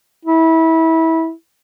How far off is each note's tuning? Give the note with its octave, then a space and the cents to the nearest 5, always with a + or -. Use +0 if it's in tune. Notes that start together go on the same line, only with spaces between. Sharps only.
E4 -25